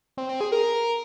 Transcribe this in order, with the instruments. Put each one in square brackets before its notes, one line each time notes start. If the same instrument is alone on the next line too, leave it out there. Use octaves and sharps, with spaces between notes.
[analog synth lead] C4
C4
G#4
A#4